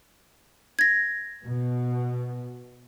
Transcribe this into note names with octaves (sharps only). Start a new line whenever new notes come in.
G#6 A#6
B2